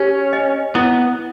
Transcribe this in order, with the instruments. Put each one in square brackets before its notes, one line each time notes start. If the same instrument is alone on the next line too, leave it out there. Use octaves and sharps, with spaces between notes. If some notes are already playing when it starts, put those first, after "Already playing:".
Already playing: [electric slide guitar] C#4 [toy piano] G4
[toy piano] D#5
[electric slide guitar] B3 [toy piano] E4